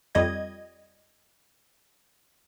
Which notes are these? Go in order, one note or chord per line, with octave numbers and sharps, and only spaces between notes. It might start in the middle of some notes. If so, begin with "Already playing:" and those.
F2 G3 D#5 G#6